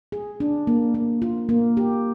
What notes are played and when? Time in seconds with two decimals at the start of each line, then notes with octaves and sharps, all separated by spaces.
0.12 G#4
0.40 D4
0.67 A#3
0.94 A#3
1.22 F4
1.49 A#3
1.77 G4